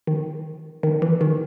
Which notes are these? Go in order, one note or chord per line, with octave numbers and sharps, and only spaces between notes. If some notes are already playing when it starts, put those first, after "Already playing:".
D#3
D#3
E3
D#3